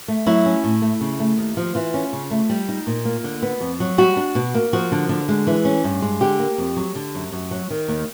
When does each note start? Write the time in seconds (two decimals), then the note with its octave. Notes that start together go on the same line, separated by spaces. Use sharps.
0.08 A3
0.26 F#3 E4
0.46 C#4
0.64 A2
0.82 A3
1.01 C#3
1.19 A3
1.38 D#2
1.57 F3
1.75 E3 F4
1.94 C#4
2.13 C#3
2.31 A3
2.50 G3
2.69 D#4
2.87 A#2
3.05 A#3
3.24 D3
3.43 B3
3.61 F2
3.80 F#3
3.98 G3 F#4
4.17 D4
4.35 B2
4.55 A#3
4.73 F3 F#4
4.92 D3
5.09 D3
5.29 G#3
5.47 E3
5.65 C#4
5.84 G2
6.02 G#3
6.21 D3 G4
6.39 A#3
6.58 F2
6.77 F#3
6.95 D3
7.15 F#2
7.32 F#2
7.51 F#3
7.70 D#3
7.88 D#2